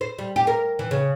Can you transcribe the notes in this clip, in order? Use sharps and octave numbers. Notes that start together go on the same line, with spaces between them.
C5
G3
G4
A#4
E3
C#3